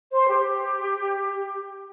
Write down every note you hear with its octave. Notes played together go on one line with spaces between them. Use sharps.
C5
G4